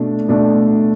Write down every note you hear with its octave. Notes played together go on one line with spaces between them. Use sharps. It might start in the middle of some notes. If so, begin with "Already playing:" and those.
Already playing: B2 A3 D4
B2 A3 D4